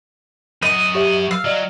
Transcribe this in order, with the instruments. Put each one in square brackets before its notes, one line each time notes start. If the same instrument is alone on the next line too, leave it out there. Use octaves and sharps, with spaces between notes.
[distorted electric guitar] F#2 F#4 [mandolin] D#5
[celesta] G4 C#5 E5
[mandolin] F5 [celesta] E6 F6
[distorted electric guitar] F#3 [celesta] D5 D#5 F6